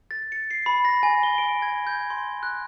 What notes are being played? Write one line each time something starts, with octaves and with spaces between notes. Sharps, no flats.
A6
C#7
C7
B5
A#6
G#5
G7
D7
G#6
G6
C6
F#6